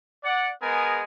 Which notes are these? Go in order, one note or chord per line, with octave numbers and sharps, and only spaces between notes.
D5 F#5
G#3 B3 G#4 A#4 G#5